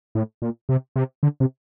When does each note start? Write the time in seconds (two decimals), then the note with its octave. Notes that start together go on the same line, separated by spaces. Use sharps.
0.15 A2
0.42 A#2
0.69 C3
0.96 C3
1.23 D3
1.40 C3